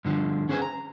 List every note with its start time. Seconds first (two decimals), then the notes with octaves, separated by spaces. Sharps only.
0.05 G2 D3 F3
0.49 C#4 G#4 B4 C5 G5 G#5
0.62 A#5